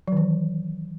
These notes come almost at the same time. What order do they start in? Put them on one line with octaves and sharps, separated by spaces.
F#3 D#3 E3